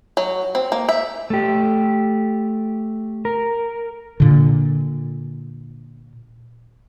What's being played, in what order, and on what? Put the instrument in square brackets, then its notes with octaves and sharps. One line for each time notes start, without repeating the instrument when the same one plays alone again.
[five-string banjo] F#3
C4
A#3
E5
[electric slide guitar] A3 G4
A#4
[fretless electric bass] A#2 D3